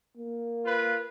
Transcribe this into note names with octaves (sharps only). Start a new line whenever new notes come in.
A#3
F4 B4